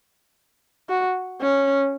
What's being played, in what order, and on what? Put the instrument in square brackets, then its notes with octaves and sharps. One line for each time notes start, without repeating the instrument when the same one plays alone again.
[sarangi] F#4
C#4